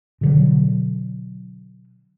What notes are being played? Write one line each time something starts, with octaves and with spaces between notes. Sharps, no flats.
B2 D3 F#3